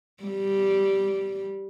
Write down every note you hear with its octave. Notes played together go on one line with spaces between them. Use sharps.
G3